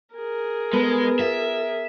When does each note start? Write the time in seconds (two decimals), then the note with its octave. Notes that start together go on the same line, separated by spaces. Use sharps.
0.15 G#4 A#4
0.73 G#3 B3 A4 B4
1.19 F4 E5